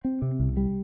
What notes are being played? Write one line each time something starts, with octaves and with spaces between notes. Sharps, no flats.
C4
C3
C2
G3